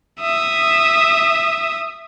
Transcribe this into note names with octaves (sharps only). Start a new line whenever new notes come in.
E5 D#6